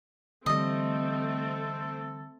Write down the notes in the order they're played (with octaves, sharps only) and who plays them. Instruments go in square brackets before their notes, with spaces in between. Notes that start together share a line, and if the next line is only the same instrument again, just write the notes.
[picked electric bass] D3 E3 G3 [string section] A3 C4 [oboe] A4 [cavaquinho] D#5